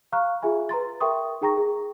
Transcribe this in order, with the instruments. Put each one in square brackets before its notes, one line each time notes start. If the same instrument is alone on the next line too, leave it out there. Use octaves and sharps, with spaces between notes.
[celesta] F5 A#5 C#6 F6 F#6
F4 G#4 E5 G#5 B5
B4 A#5 C6 A6
A#4 E5 G5 C6 C#6 D#6
D#4 G#4 G5 A#5 C#6 A#6
G#4